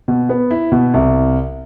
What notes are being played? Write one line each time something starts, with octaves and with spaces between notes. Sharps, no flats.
B2
B3
E4
B2
C2